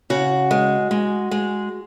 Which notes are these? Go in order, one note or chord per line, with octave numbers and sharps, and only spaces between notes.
C#3 F#4
G#3
G#3
G#3